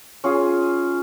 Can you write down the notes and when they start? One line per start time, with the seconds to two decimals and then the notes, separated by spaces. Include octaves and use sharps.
0.24 C#4 F4 G#4